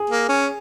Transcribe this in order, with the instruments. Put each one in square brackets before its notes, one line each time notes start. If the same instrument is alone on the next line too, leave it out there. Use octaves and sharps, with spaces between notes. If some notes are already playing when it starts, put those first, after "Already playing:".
Already playing: [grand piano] G#4
[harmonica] A#3
C#4